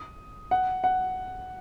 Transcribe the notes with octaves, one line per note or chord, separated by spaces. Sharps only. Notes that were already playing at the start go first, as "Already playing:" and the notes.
Already playing: D#6
F#5
F#5